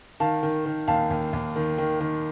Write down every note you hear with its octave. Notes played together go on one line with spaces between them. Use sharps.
D#3 F5 A5
D#3
D#3
D#2 F5 A5
D#2
D#2
D#3
D#3
D#3